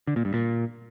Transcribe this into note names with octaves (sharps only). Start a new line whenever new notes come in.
D3
A#2
G2
A#2